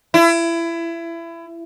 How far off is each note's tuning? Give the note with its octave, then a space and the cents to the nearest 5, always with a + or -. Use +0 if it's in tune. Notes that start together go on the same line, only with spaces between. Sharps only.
E4 +25